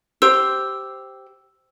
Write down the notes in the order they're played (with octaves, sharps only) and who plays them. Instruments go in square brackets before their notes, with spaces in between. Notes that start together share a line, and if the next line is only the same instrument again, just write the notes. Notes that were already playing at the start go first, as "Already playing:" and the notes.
[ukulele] G4 C5 [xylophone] E6